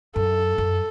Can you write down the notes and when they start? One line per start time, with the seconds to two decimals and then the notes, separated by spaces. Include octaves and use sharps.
0.15 F#2 A4
0.58 F#2